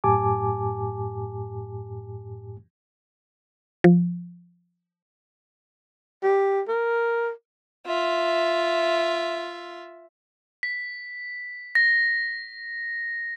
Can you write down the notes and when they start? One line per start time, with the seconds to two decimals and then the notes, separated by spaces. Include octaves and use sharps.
0.04 F#2 A2 G4 G#5 A5 D6
3.84 F3
6.23 G4
6.68 A#4
7.86 F4 E5
10.63 B6
11.75 A#6